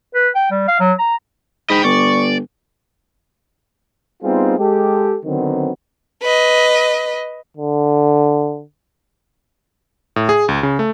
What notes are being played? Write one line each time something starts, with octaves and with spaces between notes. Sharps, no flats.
B4
G5
G3
F5
F#3
A#5
G#2 D#5 G5 B5
G1 D5 C#6
G3 B3 C4 D#4 F4 G#4
G#3 G4 A4
D3 D#3 F#3 B3 C4
B4 D#5
D3
A2
G#4
C#2
C#3
A3